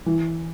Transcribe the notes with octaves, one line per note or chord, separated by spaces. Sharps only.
E3